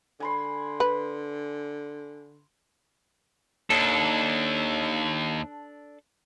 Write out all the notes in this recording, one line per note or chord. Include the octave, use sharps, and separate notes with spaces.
D3 G#5 B5 C6
B4
D#2 D4 A4